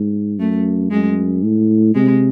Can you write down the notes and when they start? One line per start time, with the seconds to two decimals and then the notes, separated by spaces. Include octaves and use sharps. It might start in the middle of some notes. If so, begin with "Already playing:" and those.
Already playing: G#2
0.39 F#2 A3
0.91 F#2 G#3
1.43 A2
1.94 C3 G#3